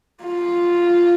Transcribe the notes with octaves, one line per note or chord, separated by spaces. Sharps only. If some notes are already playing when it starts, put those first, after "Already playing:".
F4